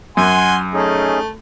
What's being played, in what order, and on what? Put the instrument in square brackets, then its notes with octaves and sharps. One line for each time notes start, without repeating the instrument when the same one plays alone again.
[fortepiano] F#2 [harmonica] F#5 G#5 C6
[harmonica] A3 [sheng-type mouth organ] C#4 D#4 G#4